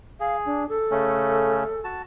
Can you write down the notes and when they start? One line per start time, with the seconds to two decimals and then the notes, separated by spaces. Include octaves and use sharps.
0.20 G#4 F5
0.46 D4
0.69 A4
0.91 C#3 A3 C#4
1.84 F#4 A5